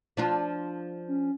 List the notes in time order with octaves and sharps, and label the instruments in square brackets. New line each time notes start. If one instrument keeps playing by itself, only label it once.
[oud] F3 D4 F4
[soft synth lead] C#4